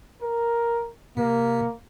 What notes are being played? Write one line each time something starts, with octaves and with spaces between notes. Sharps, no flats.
A#4
C3 A#3